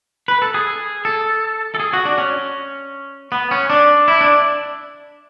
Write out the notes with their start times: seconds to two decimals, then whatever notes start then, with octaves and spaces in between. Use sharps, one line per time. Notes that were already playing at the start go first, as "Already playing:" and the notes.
0.28 B4
0.42 A4
0.54 G#4
1.05 A4
1.75 A4
1.80 G#4
1.93 F#4
2.05 D4
2.18 C#4
3.32 B3
3.51 C#4
3.70 D4
4.08 E4
4.21 D4